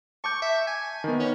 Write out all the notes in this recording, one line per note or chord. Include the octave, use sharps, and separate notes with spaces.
A5 C#6 D6 G6
E5
G#5
D#3 B3
C#4